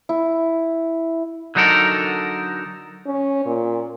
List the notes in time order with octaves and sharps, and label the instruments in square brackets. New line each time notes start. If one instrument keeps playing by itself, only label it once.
[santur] E4
[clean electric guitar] D3 F#3 D#4 A4 A#4
[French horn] C#4
A#2